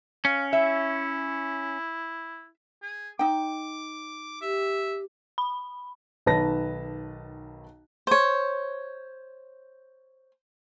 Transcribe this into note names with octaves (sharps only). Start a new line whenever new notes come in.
C#4 F5
E4 E5
G#4
D#4 G5 D6
G4 E5
B5
B1 D#3 B4 A5 A#6
C5 C#5